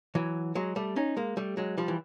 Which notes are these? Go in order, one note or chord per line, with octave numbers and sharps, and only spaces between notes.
E3 F#3
F#3 G#3
G3 A3
C#4 D#4
G#3 A#3
G3 A3
F#3 G#3
F3 G3
E3